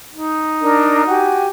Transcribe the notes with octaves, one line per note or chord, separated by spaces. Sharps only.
D#4
D4 A#4
F#4 G4 G#5